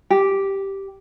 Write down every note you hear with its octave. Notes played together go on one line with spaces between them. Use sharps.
G4